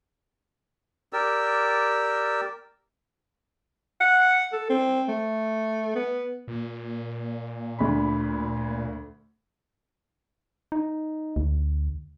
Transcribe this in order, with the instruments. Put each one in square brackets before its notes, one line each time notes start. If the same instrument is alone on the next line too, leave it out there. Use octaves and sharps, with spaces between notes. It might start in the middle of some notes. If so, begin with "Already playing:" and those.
[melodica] G4 A#4 D5 E6
[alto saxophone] F#5
A4
C4
A3
B3
[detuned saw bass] A#2
[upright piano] D2 B5
[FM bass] D#4
D2